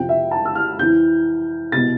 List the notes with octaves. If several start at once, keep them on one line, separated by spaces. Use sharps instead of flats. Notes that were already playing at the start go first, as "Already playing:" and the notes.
Already playing: F2 C3 F3 G5
E5
A5
E6
F6
F2 E3 G6
C2 B2 A6